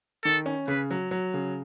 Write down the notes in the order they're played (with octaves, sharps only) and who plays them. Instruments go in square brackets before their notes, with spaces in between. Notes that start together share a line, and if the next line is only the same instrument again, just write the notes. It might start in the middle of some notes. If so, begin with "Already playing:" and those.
[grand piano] D#3 [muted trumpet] A4
[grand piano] C#4
[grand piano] C#3 [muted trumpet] B4
[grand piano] F#3
F#3
C#3